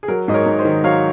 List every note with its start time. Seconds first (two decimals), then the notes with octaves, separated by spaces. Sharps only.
0.03 G#4
0.08 F#3 A#4
0.28 G#2 D#5
0.34 A#4 C#5
0.46 G#2
0.59 C5 D#5
0.65 D#3
0.84 F#3 C#5 F5